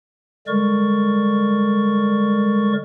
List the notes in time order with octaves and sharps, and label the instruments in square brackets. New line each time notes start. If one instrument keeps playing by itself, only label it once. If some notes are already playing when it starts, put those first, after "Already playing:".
[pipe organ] D3 G3 G#3 A#4 D5 C#6